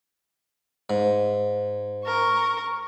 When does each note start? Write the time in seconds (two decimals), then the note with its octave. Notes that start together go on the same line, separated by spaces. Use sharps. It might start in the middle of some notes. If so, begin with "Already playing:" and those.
0.90 G#2
2.05 A#4 C#6